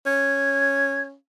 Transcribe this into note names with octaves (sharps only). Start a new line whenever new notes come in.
C#4 G#6